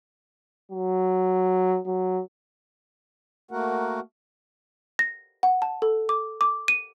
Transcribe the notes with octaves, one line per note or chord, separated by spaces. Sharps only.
F#3
F#3
A3 A#3 F#4 A#4 F#5
A#6
F#5
A5
A4
D6
D6
D#7